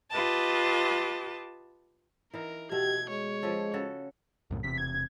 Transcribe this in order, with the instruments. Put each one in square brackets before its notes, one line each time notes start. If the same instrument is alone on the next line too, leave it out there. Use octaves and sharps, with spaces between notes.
[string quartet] F4 G4 B4 D#5 A5
[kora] E3 D#4 F5 [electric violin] A#4
[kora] B2 A3 [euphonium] G4 [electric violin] G#6
[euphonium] G#3 [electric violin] C#5
[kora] F3 C#4 A4
C#3 F#4 A4
[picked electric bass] C2 F#2 A2
[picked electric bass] E1 E2 C3 [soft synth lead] B6
[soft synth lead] G#6